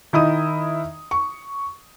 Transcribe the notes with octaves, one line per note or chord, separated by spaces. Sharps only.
D#3 E4 D#5 D#6
C#6